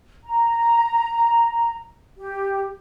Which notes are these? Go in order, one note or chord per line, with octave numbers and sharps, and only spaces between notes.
A#5
G4